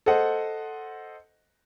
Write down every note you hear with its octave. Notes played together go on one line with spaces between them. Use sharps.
A4 C5 D#5 F#5